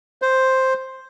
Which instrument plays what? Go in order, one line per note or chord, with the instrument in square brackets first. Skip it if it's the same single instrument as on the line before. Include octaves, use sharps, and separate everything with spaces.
[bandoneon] C5